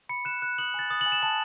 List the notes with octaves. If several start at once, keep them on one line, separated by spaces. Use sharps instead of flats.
B5 C#7
F#6 E7
F#6
D#6 F#7
G#5 A6
D#6 A6
F#7
G#5
E7
A5 F#7